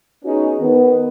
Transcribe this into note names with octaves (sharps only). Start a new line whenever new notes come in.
B3 C#4 D#4 F#4 G#4
D#3 B3